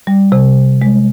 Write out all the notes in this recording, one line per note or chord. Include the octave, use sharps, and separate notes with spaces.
G3
C3
G#3